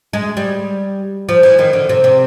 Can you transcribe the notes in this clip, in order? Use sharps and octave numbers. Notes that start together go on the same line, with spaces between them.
G#3
G3
F3
E3
D#3
D3
C3
C3